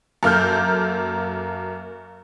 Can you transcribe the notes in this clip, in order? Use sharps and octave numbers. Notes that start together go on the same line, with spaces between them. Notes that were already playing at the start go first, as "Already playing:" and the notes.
F#2 A#3 A4 F6 G6